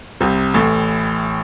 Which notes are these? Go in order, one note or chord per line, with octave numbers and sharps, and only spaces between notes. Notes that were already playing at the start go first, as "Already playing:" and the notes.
C2 C3
A1 A2